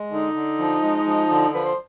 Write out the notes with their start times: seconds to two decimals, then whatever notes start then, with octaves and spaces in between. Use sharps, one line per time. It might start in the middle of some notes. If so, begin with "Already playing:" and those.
Already playing: G#3
0.11 D3 D#4
0.35 D3
0.59 F3
0.82 G#3
1.06 F3
1.30 D3
1.54 F3 B4
1.65 C5